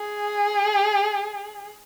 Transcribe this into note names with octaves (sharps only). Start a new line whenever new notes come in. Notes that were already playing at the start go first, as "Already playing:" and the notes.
Already playing: G#4